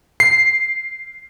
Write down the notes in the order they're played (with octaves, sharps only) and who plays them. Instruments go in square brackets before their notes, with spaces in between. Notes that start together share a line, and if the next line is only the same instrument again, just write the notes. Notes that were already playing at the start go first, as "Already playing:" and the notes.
[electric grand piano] C7